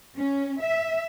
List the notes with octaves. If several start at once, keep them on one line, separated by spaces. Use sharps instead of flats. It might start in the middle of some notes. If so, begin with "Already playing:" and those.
C#4
E5